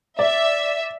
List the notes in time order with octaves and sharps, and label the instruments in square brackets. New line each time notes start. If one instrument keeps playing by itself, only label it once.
[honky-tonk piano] D5 [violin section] E5